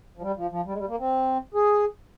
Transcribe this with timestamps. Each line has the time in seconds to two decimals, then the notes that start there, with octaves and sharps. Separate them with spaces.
0.17 F3
0.22 G3
0.37 F3
0.51 F3
0.66 G3
0.73 G#3
0.78 G3
0.88 A#3
0.99 C4
1.54 G#4